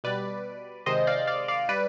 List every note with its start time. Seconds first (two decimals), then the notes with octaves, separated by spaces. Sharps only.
0.04 B2 G3 B4 D5
0.86 C3 D#3 G#3 C5 D#5
1.07 D5 F5
1.27 D5 F5
1.48 D5 F5
1.69 G3 B4 D5